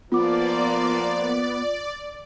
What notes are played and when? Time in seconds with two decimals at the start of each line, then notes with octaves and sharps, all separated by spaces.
0.12 F3 A#3 B3 F4 D5 D6